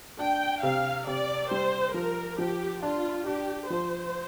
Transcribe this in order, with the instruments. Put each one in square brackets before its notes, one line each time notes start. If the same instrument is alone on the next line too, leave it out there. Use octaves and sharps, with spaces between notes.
[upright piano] D4 [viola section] G5
[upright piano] C3 [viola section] F5
[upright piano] C3 [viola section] D5
[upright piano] G3 [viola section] C5
[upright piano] F3 [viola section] A#4
[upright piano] F3 [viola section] G4
[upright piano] D4 [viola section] F4
[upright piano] D4 [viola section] G4
[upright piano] F3 [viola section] C5